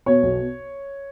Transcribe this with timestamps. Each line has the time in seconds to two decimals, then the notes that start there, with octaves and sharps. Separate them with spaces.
0.06 B2 C#5
0.23 B1